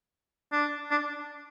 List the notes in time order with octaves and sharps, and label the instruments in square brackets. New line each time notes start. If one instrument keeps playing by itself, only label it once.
[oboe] D4
D4